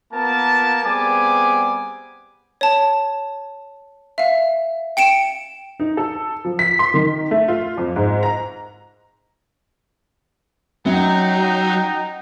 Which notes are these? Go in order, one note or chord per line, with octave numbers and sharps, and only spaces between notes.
A#3 B3 F4 A#4 A5
G3 B3 C4 G#4 G#5 D6
C#5 A5
E5 F5
G5 C#7 D7 E7
D#4
A4
F3
B6
C6
D#3
A3
F4
F2
G#2
A#5
F#2 F#3 D#4 F#5 G5